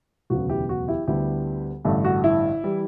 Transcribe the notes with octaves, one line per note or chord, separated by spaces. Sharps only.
E1 D2 C#3 F#3 B3 F#4
E4 G4
F#4
E4 G4
D2 D3 G3 B3 E4 G4
A1 G2 D3 A3
F#4
E4
E3 G3